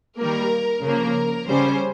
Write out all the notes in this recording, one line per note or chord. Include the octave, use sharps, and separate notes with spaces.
D#3 G3 A#3 A#4
C#3 F3 A#3 A#4
C#3 G3 C#4 C5